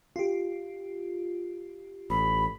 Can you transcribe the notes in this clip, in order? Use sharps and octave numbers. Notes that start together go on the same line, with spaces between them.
F4 G4
A1 B5